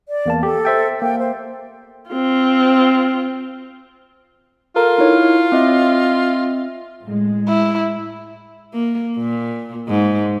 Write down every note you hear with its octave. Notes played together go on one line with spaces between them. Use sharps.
D5
E2 A#3 A5
G4 A4
C5 E5 G5
A#3 G5
C5
C4 F4
F4 A4 A#4 A#5
D#4 E4 C#5
C4 D#5 E5
A2 G#3
E4
A#3
A#2
G#2